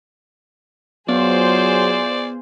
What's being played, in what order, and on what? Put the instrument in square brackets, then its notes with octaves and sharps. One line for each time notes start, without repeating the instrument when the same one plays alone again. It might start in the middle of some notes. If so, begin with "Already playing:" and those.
[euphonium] F#3 [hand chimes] B3 [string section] F4 G#4 C5 [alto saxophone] D5